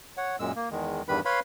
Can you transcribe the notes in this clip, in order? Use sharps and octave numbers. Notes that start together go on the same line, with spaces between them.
C#5 F#5
F#2 A#2 G#3 E6
A#3
E2 D#3 G#3
E2 G2 D#3 G3 B4 B5
B4 C#5 F5 B5 C6